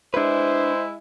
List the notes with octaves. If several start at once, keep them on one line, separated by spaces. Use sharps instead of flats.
G#3 D4 E4 B4 C5